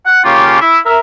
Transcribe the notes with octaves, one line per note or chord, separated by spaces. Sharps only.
F#5
C#3 A#3 C#4 F4 G4
E4
A#4 E5